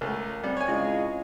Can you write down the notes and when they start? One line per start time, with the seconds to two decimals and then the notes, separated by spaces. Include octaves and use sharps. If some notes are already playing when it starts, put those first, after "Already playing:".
0.01 C#2 A3 A#4
0.44 G3 C4
0.57 C#5 G#5
0.68 C#2 E4 G#4 D#5 F5